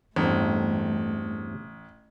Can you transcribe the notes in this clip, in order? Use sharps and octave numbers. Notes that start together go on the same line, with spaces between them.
A1 E2 G2 A3 C4